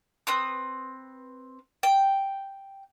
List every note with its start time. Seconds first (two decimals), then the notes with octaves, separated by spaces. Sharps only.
0.27 C4 B4 D#6
1.83 G5